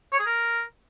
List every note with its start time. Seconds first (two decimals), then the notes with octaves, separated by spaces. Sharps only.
0.13 C#5
0.19 G#4
0.26 A#4